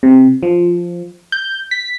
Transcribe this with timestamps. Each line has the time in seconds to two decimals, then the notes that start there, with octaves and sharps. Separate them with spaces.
0.03 C3
0.43 F3
1.32 G6
1.71 B6